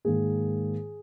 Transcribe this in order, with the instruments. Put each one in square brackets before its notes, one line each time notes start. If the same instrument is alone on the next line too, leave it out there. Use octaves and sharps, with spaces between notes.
[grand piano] G#2 D#3 A#3 G#4